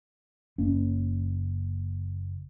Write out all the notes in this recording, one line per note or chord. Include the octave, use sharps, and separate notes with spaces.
F#1 A#3 C#4